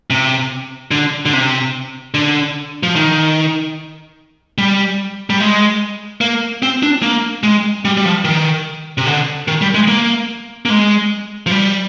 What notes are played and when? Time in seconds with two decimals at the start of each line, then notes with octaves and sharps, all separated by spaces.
0.10 C3
0.91 D3
1.26 D3
1.33 C3
2.14 D3
2.83 F3
2.96 D#3
4.58 G3
5.30 G3
5.40 G#3
6.21 A#3
6.62 C4
6.83 D4
7.02 A#3
7.43 G#3
7.85 G3
7.97 G3
8.05 F3
8.25 D#3
8.98 C3
9.06 D3
9.48 D#3
9.61 G3
9.74 G#3
9.88 A#3
10.65 A#3
10.70 G#3
11.46 F3
11.51 G3